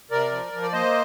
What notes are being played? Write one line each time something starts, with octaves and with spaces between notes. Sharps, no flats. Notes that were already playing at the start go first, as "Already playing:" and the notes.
C3 A#4 D5
F3
F3
D5
A#3 C5 D#5